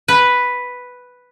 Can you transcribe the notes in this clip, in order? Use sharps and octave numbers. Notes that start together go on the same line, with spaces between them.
B4